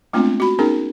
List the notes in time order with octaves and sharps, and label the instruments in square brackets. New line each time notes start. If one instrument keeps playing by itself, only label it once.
[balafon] G#3 A3 B3 C4 D4 F4
F#4 B5
B3 C#4 D#4 G#4 A#4